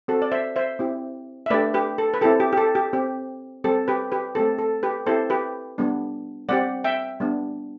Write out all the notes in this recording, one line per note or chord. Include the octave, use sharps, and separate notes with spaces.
C4 F#4 A4
D5
C5 E5
C5 E5
C4 E4 G4
E5
A3 D4 G4 B4 D5
G4 B4
A4
B4
C4 E4 G4 A4
G4
G4
A4
G4
C4 G4
G3 C4 G4 A4
G4 B4
G4 B4
A3 C4 G4 A4
A4
G4 B4
C4 E4 G4 A4 C5
G4 B4
G3 B3 D4
G3 C4 G4 D5 F#5
E5 G5
G3 B3 D4